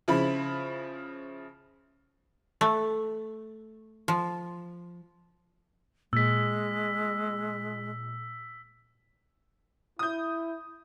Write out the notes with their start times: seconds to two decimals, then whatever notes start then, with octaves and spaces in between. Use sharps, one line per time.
0.08 C#3 F3 E4 B5
2.61 A3
4.08 F3
6.13 A#2 G#3 E6 B6
9.99 E4 D#6 G6